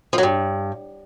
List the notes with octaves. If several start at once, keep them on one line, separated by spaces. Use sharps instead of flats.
F3
F#3
G2